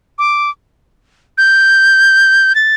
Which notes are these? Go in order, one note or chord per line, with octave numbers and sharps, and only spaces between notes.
D6
G6
A6